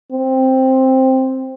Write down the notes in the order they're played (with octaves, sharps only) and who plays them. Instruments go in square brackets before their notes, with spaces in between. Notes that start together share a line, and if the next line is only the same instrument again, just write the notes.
[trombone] C4